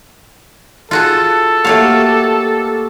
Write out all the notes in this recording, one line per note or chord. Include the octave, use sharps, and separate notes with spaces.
F4 F#4 G#4 A4
A3 A#3 F#4 G4 C#5 F5